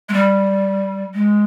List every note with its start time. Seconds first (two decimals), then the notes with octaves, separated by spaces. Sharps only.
0.09 G#3
0.14 G3
1.14 G#3